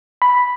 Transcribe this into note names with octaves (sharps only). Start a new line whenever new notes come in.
B5